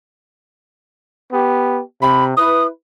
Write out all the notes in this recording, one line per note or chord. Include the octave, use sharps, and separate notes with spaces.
B3 G4
C3 B5
E4 B4 D#6